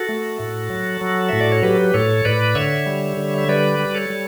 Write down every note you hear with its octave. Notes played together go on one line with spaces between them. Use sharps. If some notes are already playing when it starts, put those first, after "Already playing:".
Already playing: F#4 A4
A3
A2
F#3
F#3
A2 E5
D5
C#5
F#3 G4 B4
A2 A4 C#5
A2 B4 D5
D3 C#5 E5
G3
D3
E5
G3 B4 D5
G3
A4 C#5
G3